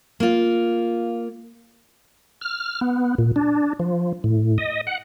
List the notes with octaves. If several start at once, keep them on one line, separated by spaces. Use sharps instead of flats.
A#3 F4
F6
B3
A#2
D4
F3
A2
D#5
F#5